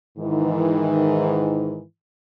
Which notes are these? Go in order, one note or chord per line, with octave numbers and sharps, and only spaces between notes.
G#2 D#3 E3